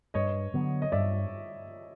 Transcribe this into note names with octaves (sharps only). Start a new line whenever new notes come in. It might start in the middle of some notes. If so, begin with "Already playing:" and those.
G2 C#5 D#5
D3 F#3 B3
D#5
G2 D5 E5